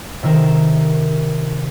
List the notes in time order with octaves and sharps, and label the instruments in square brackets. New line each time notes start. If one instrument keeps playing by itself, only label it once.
[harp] C3 D#3 A#4 E7